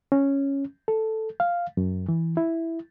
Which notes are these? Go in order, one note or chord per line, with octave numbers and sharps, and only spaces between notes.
C#4
A4
F5
F#2
E3
E4